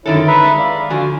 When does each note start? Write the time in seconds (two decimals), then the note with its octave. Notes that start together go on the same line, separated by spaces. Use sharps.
0.06 F#2 D3 D#3 E4 A4 C#5
0.27 B4 E5 A#5 B5
0.43 G#3
0.59 D5 F5
0.90 D3 F3 F#4 G#5